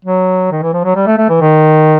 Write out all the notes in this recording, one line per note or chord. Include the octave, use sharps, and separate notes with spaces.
F#3
D#3
E3
F3
F#3
G3
A3
A3
E3
D#3